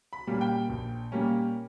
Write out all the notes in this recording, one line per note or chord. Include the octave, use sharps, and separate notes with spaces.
B5
A#2 G3 A#3 C#4
G5
A#1
A#2 G3 A#3 C#4